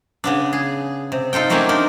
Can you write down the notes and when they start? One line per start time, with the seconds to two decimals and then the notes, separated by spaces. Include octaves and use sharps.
0.24 C#3 B3 D4
0.53 G#4
1.12 C3
1.33 D#4 F4 A4 G5
1.50 F#3 A3 A#3 C4 C#4 G4
1.69 D4 D#4 A#4